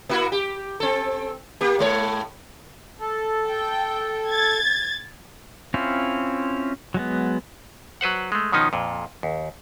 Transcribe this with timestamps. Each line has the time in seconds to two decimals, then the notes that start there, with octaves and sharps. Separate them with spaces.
0.09 A#3 E4 F#4
0.32 G4
0.80 C4 A4
1.61 A#3 G4
1.79 A2 G#3 C#5
3.00 A4
3.47 G5
4.30 G#6 A6
5.74 C4 C#4 E4 F4
6.94 F#3 G#3 B3
8.01 F#3 B4 C5 F#5
8.32 G#3 A3
8.52 B2 D#3 F3 C#4 D#4
8.73 F2 A#2
9.23 D#2